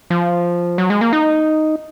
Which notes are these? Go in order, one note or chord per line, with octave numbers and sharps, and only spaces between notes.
F3
F#3
G#3
A#3
D#4